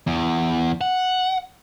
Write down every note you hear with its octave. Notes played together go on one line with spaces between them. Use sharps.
E2
F#5